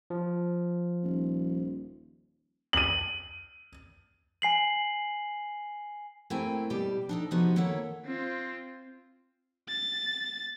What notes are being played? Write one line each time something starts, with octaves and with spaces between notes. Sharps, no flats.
F3
D#1
D#7 F#7
G#5 C7 F#7
A3 A#3 C4 E4 G5 G#5
B2 G3 G4 D5
D4 D#4 A4
C3 F3 B3 D#4 F#4
D#3 A#3 A4 C#5 E5 F#5
C4 F4
A6